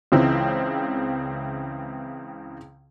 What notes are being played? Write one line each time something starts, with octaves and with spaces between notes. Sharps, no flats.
C#2 C#3 E3 C4